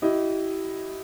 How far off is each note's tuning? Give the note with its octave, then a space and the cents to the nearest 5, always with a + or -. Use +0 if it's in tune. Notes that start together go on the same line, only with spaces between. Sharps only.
E4 +0 G4 -35 D#5 +0